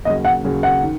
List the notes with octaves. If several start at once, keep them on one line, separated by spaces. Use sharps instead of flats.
D#2 C#3 F#3 D#5
F#5
D#2 C#3 F#3
F#5
D#3